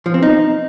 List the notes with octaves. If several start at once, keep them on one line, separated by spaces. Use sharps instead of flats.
F3
C4
D#4